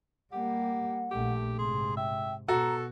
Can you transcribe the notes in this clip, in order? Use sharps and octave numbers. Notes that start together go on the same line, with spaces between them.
G3 A#3 G4 F#5
A#1 A3 G4
G#2 C3 G#4 C6
E5 G5
B2 F#4 A4 A#5